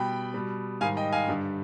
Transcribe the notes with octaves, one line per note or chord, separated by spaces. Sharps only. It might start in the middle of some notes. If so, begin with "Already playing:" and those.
Already playing: B2 G3 G5 B5
B2 G3
G#2 D#3 G3 F5 G#5
D#5 G5
F5 G#5
G2 D3 G3